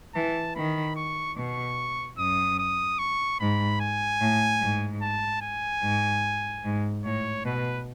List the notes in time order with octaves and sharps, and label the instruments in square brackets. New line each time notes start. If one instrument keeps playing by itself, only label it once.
[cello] E3 [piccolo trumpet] A5
[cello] D#3 [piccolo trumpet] B5
[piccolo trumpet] C#6
[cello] B2 [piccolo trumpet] C#6
[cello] F#2 [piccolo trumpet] D#6
[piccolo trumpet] D#6
C#6
[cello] G#2 [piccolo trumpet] B5
[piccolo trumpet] G#5
[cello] A2
G#2
[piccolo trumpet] A5
G#5
[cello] G#2
G#2
[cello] A2 [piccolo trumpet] C#5
[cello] B2 [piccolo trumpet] B4